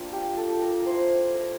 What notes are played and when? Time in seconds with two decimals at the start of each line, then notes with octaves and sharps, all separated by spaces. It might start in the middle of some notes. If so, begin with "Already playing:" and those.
Already playing: A#3 D4 F4 G5
0.13 G4
0.37 A4
0.62 A#4
0.86 A3 E4 C5
1.35 A#4